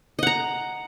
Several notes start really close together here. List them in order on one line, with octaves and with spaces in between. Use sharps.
D#5 F#5 A#5